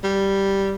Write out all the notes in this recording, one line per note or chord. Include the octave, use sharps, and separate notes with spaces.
G3